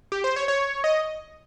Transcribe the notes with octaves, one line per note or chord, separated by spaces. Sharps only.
G4
C5
C#5
C#5
D#5